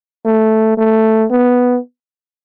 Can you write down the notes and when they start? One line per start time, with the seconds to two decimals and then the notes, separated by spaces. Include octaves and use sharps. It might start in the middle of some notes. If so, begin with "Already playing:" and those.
0.25 A3
0.78 A3
1.30 B3